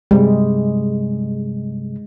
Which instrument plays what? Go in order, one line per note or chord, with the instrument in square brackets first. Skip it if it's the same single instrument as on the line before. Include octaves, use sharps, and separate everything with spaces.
[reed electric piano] G2 C3 G3 [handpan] G#3